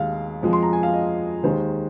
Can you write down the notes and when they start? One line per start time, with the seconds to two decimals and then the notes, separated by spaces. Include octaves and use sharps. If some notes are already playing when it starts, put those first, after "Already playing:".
Already playing: D#2 D#3 G#3 F5
0.43 F2 F3 G#3
0.53 C6
0.63 A#5
0.73 G#5
0.83 F5
0.93 D#5
1.43 D#2 D#3 G#3 C5